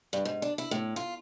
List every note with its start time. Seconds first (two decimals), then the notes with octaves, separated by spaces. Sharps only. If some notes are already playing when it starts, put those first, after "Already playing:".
0.13 G2
0.25 G#2
0.42 D4
0.58 E4
0.71 A2
0.96 F4